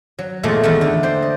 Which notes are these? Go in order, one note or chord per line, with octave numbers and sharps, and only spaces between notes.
F#3
E2 A#2 G#3 A3
E2 D#3 A3
D3
C5 D5 G5
D#5